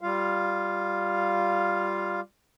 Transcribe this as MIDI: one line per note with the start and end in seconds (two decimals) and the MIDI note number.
0.01 2.21 55
0.01 2.21 65
0.01 2.21 77